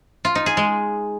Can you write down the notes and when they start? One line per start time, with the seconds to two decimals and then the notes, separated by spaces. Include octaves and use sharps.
0.25 F4
0.35 D#4
0.46 G#4
0.57 G#3